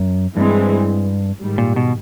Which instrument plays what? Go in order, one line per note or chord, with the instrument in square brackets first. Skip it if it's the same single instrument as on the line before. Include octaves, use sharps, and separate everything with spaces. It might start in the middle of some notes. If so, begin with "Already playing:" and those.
Already playing: [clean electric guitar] F#2
[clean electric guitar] G2 [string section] E3 G#3 C4
[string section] G#2 D#3 G3
[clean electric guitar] A#2
B2